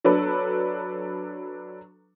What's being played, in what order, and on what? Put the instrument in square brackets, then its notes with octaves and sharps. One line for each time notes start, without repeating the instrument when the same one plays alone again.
[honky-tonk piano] F#3 D4 A4 B4